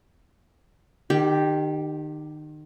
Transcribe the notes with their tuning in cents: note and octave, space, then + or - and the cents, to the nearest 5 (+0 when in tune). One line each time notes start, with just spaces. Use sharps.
D#3 -30 G4 +0